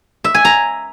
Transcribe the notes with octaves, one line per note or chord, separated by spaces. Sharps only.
E5
G#5
A#5